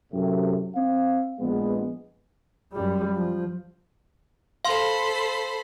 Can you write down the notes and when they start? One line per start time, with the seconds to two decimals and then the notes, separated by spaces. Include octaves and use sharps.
0.12 F#2 A2 C3
0.75 C4 F5
1.39 A#1 G#3 B3
2.73 F#2 G3
3.15 F3
4.65 A4 C5 F5 B5 C6